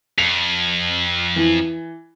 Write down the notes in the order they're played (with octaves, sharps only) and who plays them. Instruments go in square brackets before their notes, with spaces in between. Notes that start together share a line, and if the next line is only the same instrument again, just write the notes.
[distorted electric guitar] F2 [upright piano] F7
[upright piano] E3